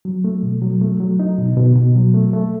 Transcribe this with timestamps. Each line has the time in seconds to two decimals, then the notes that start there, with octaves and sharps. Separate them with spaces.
0.05 F#3
0.25 A3
0.43 B2
0.62 F#3
0.81 A3
1.00 F#3
1.20 D#4
1.39 B2
1.57 B2
1.76 B2
1.95 F#3
2.14 A3
2.33 A3